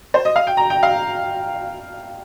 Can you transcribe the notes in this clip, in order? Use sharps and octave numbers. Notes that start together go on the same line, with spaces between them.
C5
D#5
F5
G5
A#5
G5
F5